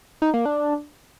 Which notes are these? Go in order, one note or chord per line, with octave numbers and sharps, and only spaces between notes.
D#4
A#3
D4